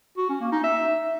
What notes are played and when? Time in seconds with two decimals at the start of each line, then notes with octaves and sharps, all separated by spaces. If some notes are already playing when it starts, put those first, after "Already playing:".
0.17 F#4
0.29 C#4
0.40 A#3
0.52 D#4
0.63 E5